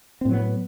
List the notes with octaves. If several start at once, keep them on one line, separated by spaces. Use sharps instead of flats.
A2 F#3 B3 C4